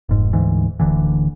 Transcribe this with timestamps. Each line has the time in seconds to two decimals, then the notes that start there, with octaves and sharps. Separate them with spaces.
0.09 F1 G#2
0.33 D2 G#2 E3
0.80 D1 D2 D3 E3